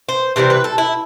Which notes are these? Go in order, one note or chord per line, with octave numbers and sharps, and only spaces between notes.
C5
C3 E3 G3 C5
B4
A4
E4